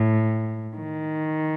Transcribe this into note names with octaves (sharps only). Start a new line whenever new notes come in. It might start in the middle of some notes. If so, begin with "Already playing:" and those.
Already playing: A2
D#3